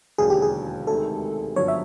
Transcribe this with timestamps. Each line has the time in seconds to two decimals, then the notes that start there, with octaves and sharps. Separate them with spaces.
0.18 E1 D#2 D3 F#3 G#4
0.30 G4
0.42 G#4
0.87 D2 C3 D#3 G#3 A4
1.56 G1 F#2 D3 F3 C#5
1.68 E5